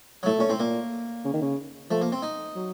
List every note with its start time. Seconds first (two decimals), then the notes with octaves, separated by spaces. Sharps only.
0.23 F#3
0.26 A2 A3
0.38 A#2 C#4
0.49 A2 C4
0.60 A#2 A#3
1.25 C#3
1.34 D#3
1.42 C#3
1.90 F3 A3
2.01 A#3
2.12 C4
2.23 D#4
2.55 F#3